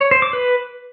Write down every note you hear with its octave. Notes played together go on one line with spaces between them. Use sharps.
C#5
C5
D6
B4